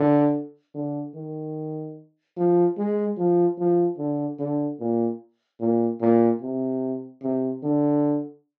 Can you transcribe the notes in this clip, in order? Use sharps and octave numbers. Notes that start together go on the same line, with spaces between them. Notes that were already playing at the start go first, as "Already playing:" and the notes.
Already playing: D3
D3
D#3
F3
G#3
F3
F3
D3
D3
A#2
A#2
A#2
C3
C3
D3